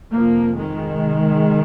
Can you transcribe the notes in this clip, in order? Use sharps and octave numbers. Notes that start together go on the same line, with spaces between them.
F2 C3 F3 A#3
D#3 G#3
C2 C3